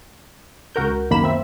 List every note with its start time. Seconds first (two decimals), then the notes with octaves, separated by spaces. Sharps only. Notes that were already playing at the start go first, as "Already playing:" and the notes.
0.75 C#2 F#4 A#4 G6
1.10 F#2 D#3 A#3 B5 E7
1.24 C4 E5